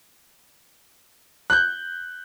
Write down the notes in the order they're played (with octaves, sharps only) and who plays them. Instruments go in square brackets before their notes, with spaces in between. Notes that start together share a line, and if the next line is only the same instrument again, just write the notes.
[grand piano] F#6 G6